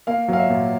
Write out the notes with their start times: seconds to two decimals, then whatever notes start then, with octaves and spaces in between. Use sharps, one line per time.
0.07 A#3 F5
0.28 F#3 F5
0.39 E5
0.50 A#2